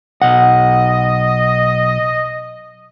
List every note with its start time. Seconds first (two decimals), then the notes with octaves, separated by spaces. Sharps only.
0.22 B1 D#5 F#5